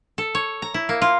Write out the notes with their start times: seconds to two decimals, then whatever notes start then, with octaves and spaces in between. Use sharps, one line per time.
0.18 A4
0.35 C#5
0.62 A#5
0.74 E4
0.89 A#3
1.02 F4